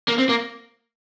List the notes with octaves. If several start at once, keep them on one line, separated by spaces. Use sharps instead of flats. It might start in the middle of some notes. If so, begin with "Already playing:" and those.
A#3
C4
A#3